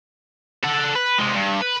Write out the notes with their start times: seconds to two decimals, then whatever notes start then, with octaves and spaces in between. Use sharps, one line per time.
0.64 A4 F#5
0.96 B4
1.18 C3 G#3
1.34 G2
1.61 B4